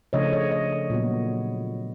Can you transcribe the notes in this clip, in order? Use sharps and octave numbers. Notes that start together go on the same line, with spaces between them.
C#3 F3 A3 D4 C#5 D#5
C#5 D#5
C#5 D#5
A#2 F#3 B3